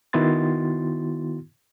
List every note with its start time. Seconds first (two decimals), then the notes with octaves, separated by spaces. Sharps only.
0.13 D#3 B3 E4 F#4 C6 A6